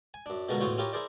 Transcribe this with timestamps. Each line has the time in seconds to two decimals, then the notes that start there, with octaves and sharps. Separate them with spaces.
0.14 G#5
0.26 F#2 D4
0.49 B2 D3 F3 G#3 F#4 A#4
0.60 E2 A2 F4 F#4 C5 C#5
0.78 C#4 E4 F4 G4 A#4 C#5
0.93 E4 G#4 A#4 C5 D5